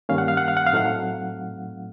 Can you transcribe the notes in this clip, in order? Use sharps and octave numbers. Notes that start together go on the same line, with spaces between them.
G2 D#3 G3 A#3 C#4 F5
F#5
F5
F#5
F5
F#5
F5
A2 F#3 A3 C4 D#4 F#5
F5